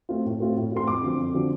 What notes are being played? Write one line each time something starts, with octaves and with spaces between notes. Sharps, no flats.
A3 C4 F4
A2
A3 C4 F4
A2
A3 C4 F4 C6
F2 D6
D3 F3 C4
F2
D3 F3 C4